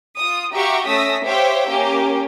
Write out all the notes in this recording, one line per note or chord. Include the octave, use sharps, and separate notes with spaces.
F4 D#6
F#4 G4 E5 F5 A#5 C#6
A3 C#4 D#6 E6 A#6 B6
G4 C5 C#5 E5 F5 G5
A#3 C#4 G4